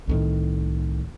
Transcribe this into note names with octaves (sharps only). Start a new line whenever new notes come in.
C2 A2 D#3